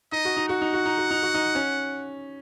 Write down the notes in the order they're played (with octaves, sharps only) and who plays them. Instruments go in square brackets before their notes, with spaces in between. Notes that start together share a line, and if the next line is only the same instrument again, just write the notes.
[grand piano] D#4 [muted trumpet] D#5
[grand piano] F#4
D#4
[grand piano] F#4 [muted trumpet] F#5
[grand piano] D#4
F#4
D#4
F#4
D#4
F#4
D#4
C#4